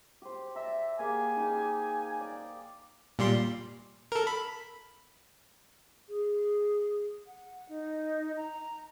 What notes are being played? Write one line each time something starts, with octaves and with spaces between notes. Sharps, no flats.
G4 C5
D5 E5 A#5
A#3 G4 G#4 G#5
D#4 G4 G#4
D5
A#2 G3 C6
A4 A#4
B5
G#4
F#5
D#4
A#5